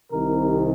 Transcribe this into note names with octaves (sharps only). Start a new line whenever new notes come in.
C2 C3 D#3 A#4